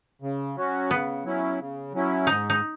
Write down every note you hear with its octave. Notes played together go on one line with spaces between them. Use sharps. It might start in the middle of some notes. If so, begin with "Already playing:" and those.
C#3
F#3 C#4 F#4
C#3 B3
F#3 C#4 E4
C#3
F#3 C#4 E4
G#2 D#4
D#4